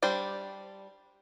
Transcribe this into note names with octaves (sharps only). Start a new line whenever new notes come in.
G3 D4 C5